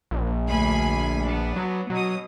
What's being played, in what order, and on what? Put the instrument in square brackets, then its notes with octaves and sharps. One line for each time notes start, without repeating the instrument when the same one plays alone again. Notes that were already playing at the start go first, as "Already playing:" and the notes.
[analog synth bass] A#1
[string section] D2 G#5 B5
B3 D4
[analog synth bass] F#3
[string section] B2 D#6 [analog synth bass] F#3